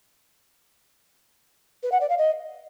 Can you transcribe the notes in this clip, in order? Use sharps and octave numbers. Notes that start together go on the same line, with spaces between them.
B4
F#5
D5
F5
D#5